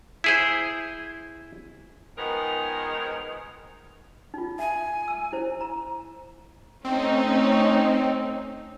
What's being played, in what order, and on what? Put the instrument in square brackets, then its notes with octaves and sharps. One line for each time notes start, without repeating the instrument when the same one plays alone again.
[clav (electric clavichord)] E4 G#4 C5
[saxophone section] D#3 F3 G#3 B3 A#4
[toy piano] D#4 F4
[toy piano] E5 [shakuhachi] G#5
[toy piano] E6
E4 C5
A#5
[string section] A3 C#4 D#4 [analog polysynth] C4